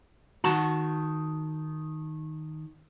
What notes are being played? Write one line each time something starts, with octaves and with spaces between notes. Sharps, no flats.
D#3 F#4 A5